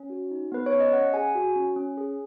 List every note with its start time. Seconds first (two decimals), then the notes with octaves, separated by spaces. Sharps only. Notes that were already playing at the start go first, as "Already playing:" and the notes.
Already playing: C#4
0.10 F#4
0.31 D#4
0.52 B3 B4
0.66 C#5
0.73 C#4
0.80 D#5
0.93 C#4 F#5
1.14 G#4 G#5
1.35 F#4
1.56 C#4
1.76 C#4
1.97 G#4